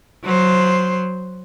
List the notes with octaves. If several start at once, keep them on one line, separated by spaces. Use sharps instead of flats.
F#3 C5